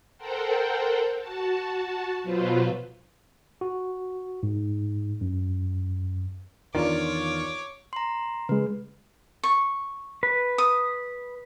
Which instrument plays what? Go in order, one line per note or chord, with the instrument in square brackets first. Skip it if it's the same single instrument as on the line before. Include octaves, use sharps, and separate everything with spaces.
[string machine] A4 A#4 C5 F#5 G5
F#4 A5
B2 F#3 F4 B4 C5
[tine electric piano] F#4
G#2
F#2
[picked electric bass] E2 D#3 [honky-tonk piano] D4 F4 [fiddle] C#5 D6
[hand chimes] A#5 C6
[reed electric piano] C#3 G#3 [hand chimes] B4
[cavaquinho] C#6
[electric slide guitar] B4
[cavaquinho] D#6